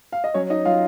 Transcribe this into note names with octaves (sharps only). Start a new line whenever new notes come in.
F5
D#5
F#3 C#4 C#5
D#4 D#5
F#3 F4 F5